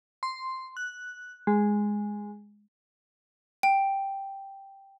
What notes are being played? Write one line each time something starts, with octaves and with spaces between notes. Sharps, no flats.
C6
F#6
G#3
G5